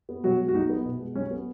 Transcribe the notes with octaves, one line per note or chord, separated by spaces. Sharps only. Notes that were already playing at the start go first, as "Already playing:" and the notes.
B3
B2 F#3 F#4
G#3
F#4
B1 D#4
B3
B2
G#3
B1 C#4
B3